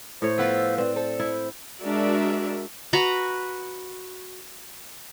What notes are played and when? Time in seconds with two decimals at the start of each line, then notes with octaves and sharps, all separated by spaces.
0.22 A2 C5 C#5
0.38 F3 B3 F4 E6
0.78 C4 B4 D5
0.96 A4 C5
1.20 E4
1.81 G#3 D4 F#4 A#4 D5 E5
2.93 F#4 B4 A#5